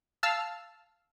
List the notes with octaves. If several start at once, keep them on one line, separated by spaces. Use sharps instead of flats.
F5 A5 E6 F6